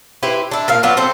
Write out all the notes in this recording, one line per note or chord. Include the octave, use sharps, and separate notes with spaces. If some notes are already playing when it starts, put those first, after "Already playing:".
E4 G4 B4 C5
D4 E4
A#2 A#4 F5
F#3 B3 D4 F4
C4 A4 C5